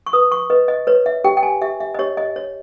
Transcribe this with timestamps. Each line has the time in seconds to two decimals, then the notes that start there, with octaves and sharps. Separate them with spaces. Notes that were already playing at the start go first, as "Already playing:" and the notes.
0.06 C#6
0.13 B4 D#6
0.32 C#6
0.50 B4 D#5
0.68 D#5
0.87 B4 C#5
1.06 E5
1.24 G4 G5
1.37 G5
1.43 G#5
1.62 G4 E5
1.80 E5
1.94 D#5
1.99 G4 C#5
2.17 D#5
2.36 C#5